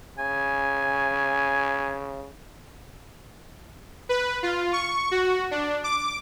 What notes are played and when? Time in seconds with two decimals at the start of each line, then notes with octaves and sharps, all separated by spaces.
0.18 C#3 G#5
4.09 B4
4.43 F4
4.73 C#6
5.11 F#4
5.51 D4
5.84 D6